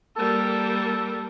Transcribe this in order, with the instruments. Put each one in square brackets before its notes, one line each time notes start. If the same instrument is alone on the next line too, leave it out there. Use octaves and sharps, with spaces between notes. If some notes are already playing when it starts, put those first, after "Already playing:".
[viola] G3 A#3 [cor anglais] A4